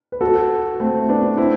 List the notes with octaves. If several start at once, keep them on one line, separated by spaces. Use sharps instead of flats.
B4
F#4 A4
A3 C4
B3 D4
C4 E4